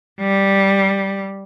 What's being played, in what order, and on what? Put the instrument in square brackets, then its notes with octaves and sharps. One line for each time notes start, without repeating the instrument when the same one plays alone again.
[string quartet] G3